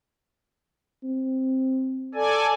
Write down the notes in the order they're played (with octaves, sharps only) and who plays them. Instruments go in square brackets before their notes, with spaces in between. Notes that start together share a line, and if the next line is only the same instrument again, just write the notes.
[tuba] C4
[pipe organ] A4 D5 G#5